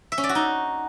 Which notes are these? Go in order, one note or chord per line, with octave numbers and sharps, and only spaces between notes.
E5
C#4
D5
F#4
D#4